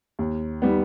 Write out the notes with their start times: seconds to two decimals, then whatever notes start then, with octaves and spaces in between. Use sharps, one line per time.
0.19 D#2
0.62 D#3 G3 B3